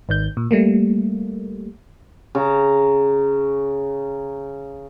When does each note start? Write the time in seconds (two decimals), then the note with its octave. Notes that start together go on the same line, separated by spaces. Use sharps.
0.09 G#1 D#3 G6
0.37 A#2
0.51 G3 A3 A#3
2.35 C#3 A#5